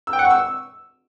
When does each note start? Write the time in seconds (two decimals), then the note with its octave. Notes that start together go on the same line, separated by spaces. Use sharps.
0.07 E6
0.13 G5
0.19 F#5
0.25 C#6
0.31 E6